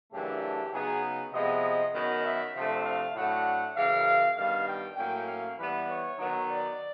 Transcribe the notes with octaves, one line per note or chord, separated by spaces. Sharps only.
F#2 C#3 E3 A3 D4 G4
C#3 F#3 B3 D#4 G#4
C3 F3 G#3 B3 D#5
F#2 D#3 F#3 B3 D#5
E5
C3 F3 A3 D4
F5
A2 F#3 A3 D4 F#5
F#2 C#3 E3 G#3 F5
G2 D#3 G3 B3 F5
G5
A2 F#3 A#3 C#4 G5
F5
E3 G3 B3 B4
C#5
D#3 F#3 B3 D#4
D5